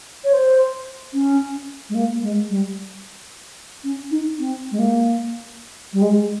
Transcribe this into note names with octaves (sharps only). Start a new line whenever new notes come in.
C#5
C5
C#4
G#3
A#3
G#3
G3
C#4
D#4
C4
G#3
A#3
G3
G#3